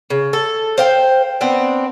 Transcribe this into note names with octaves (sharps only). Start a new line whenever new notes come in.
C#3
A4
C5 F5 G5
B3 C4 D4